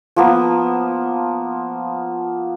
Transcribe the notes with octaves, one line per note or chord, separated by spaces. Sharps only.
F3 A#3 B3